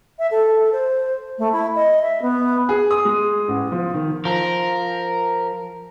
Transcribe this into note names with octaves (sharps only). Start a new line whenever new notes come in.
E5
A4
C5
A3
E4
D#5
E5
B3
G#4
D#6
G#3
A1
F3
D#3
F3 A#4